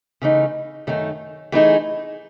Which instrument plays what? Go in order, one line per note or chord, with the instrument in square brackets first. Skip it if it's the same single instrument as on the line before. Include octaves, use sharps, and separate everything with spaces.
[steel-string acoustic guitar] C#3 E3 A3 D#4
F#2 D#3 A3 D#4
E3 A3 D#4 G#4